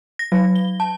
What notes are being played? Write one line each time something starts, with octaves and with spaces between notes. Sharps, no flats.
A#6
F#3
G7
A5